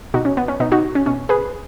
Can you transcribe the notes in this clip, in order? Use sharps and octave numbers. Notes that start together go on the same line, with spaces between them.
B2 D#4 F#4
C#4
B3
C#4
B2 B3 D#4
D#4 F#4
C#4
B2 C#4
G#4 B4